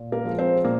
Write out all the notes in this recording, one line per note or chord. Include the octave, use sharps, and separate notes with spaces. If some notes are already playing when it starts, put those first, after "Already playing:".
Already playing: A#2
A#3 A#4
F3 G#3
C4 C5
A#2 A#3